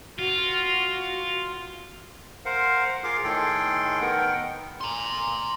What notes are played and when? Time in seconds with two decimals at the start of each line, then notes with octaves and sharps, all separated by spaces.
0.19 F4 F#4
2.45 A#4 C5 F5 F#5
3.04 F4 G#4 A#4 F5 C6 D6
3.24 A2 D#3 G#4 A4 G5 C6
4.01 D#3 B3 A#4 F#5 G5
4.81 A#5 C6